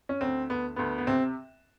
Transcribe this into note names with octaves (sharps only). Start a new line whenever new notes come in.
C#4
D2 C4
D2 B3
D2 B3
B3
C3 C4